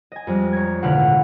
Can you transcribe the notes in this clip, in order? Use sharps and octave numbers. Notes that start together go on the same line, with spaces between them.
D#5 G#5
F2 G3 G#3
C#5 A#5 G#6
D#1 A1 B2 D3 F5 F#5